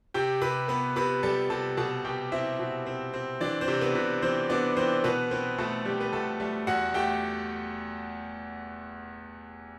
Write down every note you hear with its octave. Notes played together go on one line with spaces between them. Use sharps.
C3 G4 G5
C3 B4 B5
B3 B4 B5
C3 B4 B5
G3 A4 A5
C3 A4 A5
B2 A4 A5
B2 G4 G5
C4 E4 E5
B2
C4
C4
E3 D4 D5
C4 C5
C3
B3 B4
C3
E3 C4 C5
B3 D4 D5
E3 C4 C5
B2 B3 B4
B3 C4 B4
B2 A3 A4
G3 C4 G4
B4
B2 A3 A4
G3 A3 A4
E2 F#4 F#5
A3 G4 G5